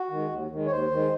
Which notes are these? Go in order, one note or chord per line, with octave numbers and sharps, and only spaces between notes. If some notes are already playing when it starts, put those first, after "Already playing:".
Already playing: F#4
D#3 G#3
D#2
D#3 G#3
C#5
D#2 C5
D#3 G#3